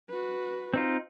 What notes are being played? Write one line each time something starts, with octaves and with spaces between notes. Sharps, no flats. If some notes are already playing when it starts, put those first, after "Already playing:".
F#4 B4
C4 D#4 F4